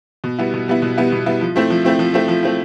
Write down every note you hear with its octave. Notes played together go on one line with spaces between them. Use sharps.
B2
G3 B3 E4
B2
G3 B3 E4
B2
G3 B3 E4
B2
G3 B3 E4
F3
A3 C4 E4
F3
A3 C4 E4
F3
A3 C4 E4
F3
A3 C4 E4